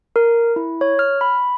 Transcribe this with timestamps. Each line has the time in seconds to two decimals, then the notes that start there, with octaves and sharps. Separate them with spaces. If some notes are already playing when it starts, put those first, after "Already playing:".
0.16 A#4
0.56 E4
0.81 C#5
0.99 F6
1.21 B5